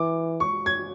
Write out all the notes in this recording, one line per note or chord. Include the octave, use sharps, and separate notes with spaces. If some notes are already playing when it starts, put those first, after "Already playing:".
Already playing: E3 D6
C#6
G#6